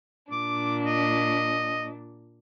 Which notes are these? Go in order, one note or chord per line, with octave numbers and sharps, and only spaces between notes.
A#2 D4 D6
D#5